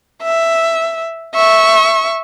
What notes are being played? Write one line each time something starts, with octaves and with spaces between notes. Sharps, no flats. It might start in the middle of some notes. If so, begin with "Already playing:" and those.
E5
E5 C#6